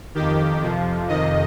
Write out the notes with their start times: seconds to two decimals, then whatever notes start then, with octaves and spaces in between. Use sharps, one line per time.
0.15 F2 D#3 G4
0.62 F2 C3 F3
1.09 F2 C3 D#3 D#5